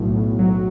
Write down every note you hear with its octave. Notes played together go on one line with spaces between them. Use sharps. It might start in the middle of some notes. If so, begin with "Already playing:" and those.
Already playing: B1 A2
B1
F#3